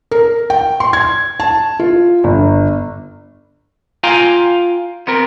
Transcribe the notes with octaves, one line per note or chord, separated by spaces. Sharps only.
A#4
G5
C6
G#6
A5
F4
G1
F4 F5 G5 G#5 A#5
B3 C4 A#4